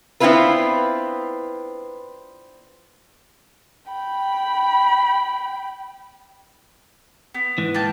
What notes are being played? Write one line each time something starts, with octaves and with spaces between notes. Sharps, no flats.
B3 C4 D4 E4 F4 B4
G5 B5
B3
G#2 E3
A#3 G5 A5